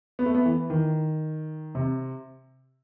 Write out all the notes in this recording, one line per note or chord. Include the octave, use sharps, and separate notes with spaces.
B3
A3
B3
E3
D#3
C3